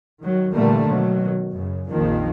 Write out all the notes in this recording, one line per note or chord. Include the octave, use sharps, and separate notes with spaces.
D#3 F#3
A#2 D3 E3 G3 A3 A#3
B2 D#3 F#3
F#2 C#3
A#1 F2 D#3 F3 A#3